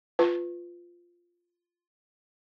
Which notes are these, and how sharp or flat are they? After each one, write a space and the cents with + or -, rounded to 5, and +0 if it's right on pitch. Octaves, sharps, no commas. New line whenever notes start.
F4 +0 B4 +20